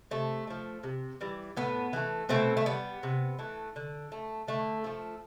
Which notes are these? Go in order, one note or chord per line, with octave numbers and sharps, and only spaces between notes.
C3 A3
F3 A3
C3
E3 G3
A2 B3
E3 A3
B2 A3 C4
A3
G3 B3
C3
E3 A3
D3
A3
D3 A3
F3 A3